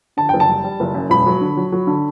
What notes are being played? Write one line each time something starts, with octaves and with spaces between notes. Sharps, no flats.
D3 A5
F#1 G5
A5
G3
G3
F#1
F#2
E1 B5
F#3
D3
F#3
F#3
D3